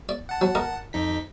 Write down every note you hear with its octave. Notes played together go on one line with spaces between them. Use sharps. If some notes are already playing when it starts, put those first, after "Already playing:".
D5
F#5 A5
F#3
A#4 D#5 D6
F2 D#4 B6